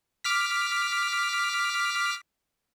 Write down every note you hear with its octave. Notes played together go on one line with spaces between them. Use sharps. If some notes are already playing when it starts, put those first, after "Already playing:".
D6 F6 B6